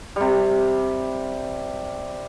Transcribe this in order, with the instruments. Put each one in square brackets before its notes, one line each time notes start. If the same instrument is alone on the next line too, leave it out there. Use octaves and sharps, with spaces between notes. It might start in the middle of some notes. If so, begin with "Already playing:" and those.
[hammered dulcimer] C3 G3